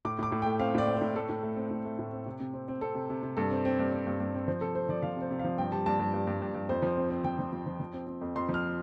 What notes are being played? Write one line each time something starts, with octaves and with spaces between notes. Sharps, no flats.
A2 D6
A2 D6
A2
A3 G5
C4 F5
A2 D5
C4
A2 C5
A3 A4
A2
A3
C4
A2
A3
A2
C4
C3
C3
C4
C4
C4 A4
C3
C3
C3
G2 A4
C4
C4
G2
C4
G2
G2
C4
F3 C5
C3 A4
C4 C5
F3 D5
F3 F5
C3
C5
C3
F3 F5
G2 G5
G3 A5
G2 A5
G2
G2
G2
G2
G2
F2 C5
F3
C4
C4
F3 G5
F3
F3
F3
F3
C4
C4
F2
F2 C6
F3
F6